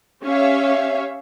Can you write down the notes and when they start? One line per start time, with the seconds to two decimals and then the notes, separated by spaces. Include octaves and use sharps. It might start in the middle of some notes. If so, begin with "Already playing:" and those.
0.24 C#4 G4 C#5 E5 F5